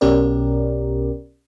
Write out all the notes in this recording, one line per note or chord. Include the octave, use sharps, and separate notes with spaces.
B1 B2 C#4 G4 A#4 D5